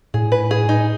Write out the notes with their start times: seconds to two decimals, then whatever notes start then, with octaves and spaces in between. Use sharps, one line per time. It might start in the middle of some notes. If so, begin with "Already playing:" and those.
0.14 A2 G#4
0.32 B4
0.51 G#4
0.69 D#4